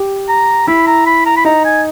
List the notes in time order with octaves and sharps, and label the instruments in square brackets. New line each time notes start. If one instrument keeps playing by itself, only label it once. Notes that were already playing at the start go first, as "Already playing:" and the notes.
Already playing: [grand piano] G4
[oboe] A#5
[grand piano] E4 [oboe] B5
[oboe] A#5
B5
A#5
B5
[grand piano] D#4 [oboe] A#5
[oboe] G#5